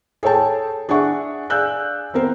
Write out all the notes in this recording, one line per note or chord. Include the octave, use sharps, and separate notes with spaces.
G#4 A4 C#5 G5 A5
D4 G#4 E5 F#5 C#6
G#4 D5 F5 E6 F#6 G6
B3 C4 A#4 C5